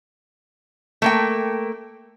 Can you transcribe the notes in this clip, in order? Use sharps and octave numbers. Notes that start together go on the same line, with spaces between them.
A3 A#3 G5